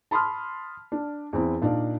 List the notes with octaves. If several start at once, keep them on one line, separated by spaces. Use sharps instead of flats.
A5 B5 C6 D#6 F6
D4
E2 C4 E4
A#2 D4 D#4 D5 F5